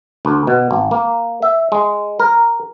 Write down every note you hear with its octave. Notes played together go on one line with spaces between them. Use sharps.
D2
B2
G#1
A#3
E5
G#3
A#4